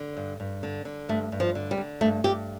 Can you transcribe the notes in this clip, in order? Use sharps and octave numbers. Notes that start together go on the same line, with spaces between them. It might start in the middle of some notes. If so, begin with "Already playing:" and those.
Already playing: D3
G2
G2
D3
D3
G2 A3
G2
F3
D3
G3
D3
G2 A3
G2 G4